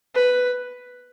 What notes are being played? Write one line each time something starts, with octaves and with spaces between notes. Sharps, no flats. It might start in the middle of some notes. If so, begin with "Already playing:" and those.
B4